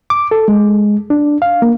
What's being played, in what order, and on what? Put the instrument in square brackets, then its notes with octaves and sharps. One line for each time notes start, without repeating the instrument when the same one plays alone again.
[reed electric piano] D6
A4
G#3
D4
F5
A#3